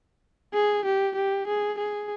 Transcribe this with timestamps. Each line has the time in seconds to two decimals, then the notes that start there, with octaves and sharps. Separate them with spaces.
0.54 G#4
0.85 G4
1.15 G4
1.47 G#4
1.78 G#4